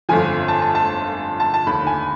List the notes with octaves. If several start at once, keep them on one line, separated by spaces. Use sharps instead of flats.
G1 F2 D3 F3 G#5
A5
A5
A5
A5
A5
F1 D#2 D3 B5
G#5